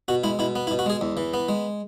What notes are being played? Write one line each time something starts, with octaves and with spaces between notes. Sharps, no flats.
B2 F#4
G#3 E4
B2 E4
B3
E4
B2
F#4
G#3 G#4
E2
E3
B3
G#3